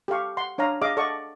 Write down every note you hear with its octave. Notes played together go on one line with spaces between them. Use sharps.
G4 A4 F5 C#6
F#5 C6
D4 C#5 F5 A#5
G#4 D5 D#5 F5 D6
A4 D5 D#5 F#5 C#6